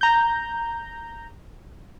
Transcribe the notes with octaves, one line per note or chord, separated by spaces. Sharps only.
A#5 G6